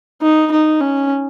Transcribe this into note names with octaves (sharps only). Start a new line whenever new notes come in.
D#4
D#4
C#4